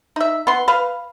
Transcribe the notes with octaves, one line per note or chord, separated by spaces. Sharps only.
D#4 E5
B3 C6
B4 F5